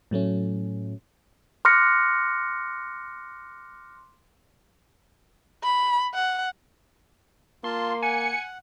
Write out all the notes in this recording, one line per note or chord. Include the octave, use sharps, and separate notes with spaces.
A2 F#3 A3 C#4
C6 D6 F6 F#6 A#6 C#7
B5
F#5
A#3 F4 A5 C6
F#5 G#5 C#7